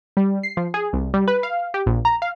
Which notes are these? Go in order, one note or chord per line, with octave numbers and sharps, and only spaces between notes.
G3
C7
F3
G#4
C2
G3
B4
F5
G4
A#1
A#5
F5